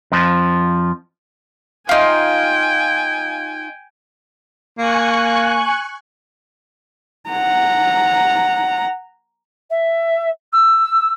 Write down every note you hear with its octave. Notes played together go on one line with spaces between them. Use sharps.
F2 F3
D#4 F4 G5 G#5
A#3 G#5 C#6 F#6
F#5 A#5
E5
E6